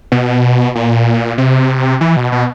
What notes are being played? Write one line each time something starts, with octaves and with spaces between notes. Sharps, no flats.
B2
A#2
C3
E3
B2
B2